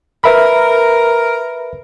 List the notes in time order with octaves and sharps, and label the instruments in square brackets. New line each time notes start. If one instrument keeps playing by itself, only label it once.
[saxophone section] A#4 [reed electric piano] B4 E5 B5